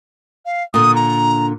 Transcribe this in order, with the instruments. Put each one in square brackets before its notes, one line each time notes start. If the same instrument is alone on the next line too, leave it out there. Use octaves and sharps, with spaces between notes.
[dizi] F5
[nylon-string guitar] A#2 D3 [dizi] D#6
[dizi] A#5